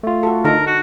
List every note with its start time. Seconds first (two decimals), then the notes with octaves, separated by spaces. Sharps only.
0.03 A3 F4
0.23 F#4 A4
0.44 D3 D#4 A4 A#4
0.66 F#4